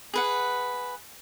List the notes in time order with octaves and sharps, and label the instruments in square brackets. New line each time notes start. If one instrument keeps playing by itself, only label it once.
[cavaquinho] G#4 B4 F#5